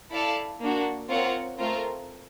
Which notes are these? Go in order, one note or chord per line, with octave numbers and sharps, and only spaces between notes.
E4 A4 D5 F5 A5
A#3 D4 F#4
C4 F4 A#4 C#5 F#5
A3 C4 F4 A#4